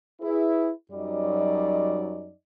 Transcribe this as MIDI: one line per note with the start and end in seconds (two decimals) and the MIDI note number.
0.21 0.70 64
0.21 0.70 68
0.21 0.70 71
0.91 2.32 42
0.91 2.32 54
0.91 2.32 55
0.91 2.32 63
0.91 2.32 74
0.91 2.32 75